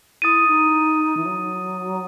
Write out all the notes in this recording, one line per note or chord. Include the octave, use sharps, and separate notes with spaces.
E4 D#6 A6 D#7
D#4
E3
F#3